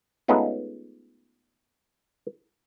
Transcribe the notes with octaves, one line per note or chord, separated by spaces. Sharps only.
G#3 A3 B3 C#4 D#4 F4